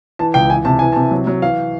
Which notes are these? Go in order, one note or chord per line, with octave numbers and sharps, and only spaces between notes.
E3 A5
C#2 G5
E3 G#5
C3 A5
E3 G#5
C3 A5
F#3
F#3
E3 F5